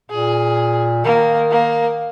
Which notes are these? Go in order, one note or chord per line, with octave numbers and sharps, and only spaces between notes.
A#2 G#4
D#3 A#3
A#3